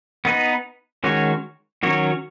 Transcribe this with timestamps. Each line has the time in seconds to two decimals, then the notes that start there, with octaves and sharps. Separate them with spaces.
0.25 B3 D#4 B4
1.04 D#3 G#3 C#4 F#4 C#5
1.83 D#3 F#3 C#4 F#4 C#5